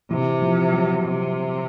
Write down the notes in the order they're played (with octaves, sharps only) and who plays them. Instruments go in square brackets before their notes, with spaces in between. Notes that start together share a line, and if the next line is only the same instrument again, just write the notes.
[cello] C3 [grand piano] E3
[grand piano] F3
F#3
[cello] C3